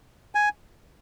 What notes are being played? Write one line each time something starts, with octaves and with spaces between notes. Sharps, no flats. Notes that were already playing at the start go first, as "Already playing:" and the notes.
G#5